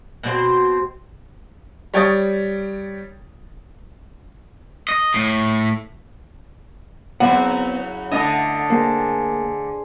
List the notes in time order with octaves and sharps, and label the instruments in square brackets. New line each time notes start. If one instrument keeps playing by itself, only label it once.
[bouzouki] B2 C4 F#4 C5
[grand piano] G3 C#5 G5 C#6 D#6 A6
[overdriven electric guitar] D#5
A2
[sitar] C#3 F#3 E4 [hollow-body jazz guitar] B3 C4 [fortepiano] F#5
[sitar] D3 A3 D#5 [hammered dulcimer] D4 A5 [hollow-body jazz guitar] E4
[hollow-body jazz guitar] A#3 [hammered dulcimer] G#4 C5